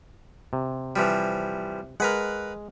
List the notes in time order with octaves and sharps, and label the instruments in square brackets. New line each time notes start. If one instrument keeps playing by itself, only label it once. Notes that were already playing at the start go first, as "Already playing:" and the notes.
[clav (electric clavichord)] C3
[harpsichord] E3 F3 G3
[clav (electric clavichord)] G#3 [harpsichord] A#4 B4 F#5